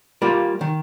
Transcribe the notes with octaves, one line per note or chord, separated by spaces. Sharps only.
G3 A#3 F4
D#3